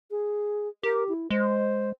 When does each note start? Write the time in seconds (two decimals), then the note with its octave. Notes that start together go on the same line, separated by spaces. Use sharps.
0.11 G#4
0.83 G4 A#4
1.09 E4
1.30 G#3 C5